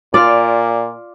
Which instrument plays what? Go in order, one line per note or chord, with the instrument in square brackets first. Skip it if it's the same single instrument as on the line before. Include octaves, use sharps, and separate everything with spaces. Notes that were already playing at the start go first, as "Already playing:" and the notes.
[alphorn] A#2 [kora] F4 D5 [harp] D6 F6